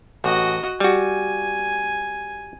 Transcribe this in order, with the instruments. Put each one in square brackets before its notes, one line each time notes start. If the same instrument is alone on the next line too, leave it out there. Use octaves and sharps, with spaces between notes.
[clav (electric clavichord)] A1 [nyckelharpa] F#4 D#5
[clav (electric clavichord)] G3 F#4 [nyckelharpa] G#5